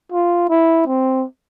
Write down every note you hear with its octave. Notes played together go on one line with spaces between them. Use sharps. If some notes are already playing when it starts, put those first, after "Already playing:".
F4
E4
C4